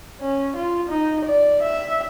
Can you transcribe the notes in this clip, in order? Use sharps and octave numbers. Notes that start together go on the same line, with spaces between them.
C#4
F4
D#4
D5
E5